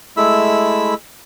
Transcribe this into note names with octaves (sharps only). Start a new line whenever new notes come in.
G#3 A3 E4 B5 E6